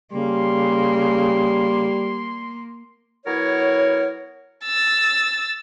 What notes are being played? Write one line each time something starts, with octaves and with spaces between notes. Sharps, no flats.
C#3 G3 A#3 C6
F#3 B3 E4 A#4 C#5
E6 A6